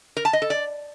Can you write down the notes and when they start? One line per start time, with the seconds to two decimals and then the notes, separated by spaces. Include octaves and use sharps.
0.17 A#4
0.25 A5
0.33 D#5
0.42 A4
0.50 D5